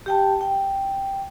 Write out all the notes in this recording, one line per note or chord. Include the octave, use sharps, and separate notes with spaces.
G4 G5 A5
G5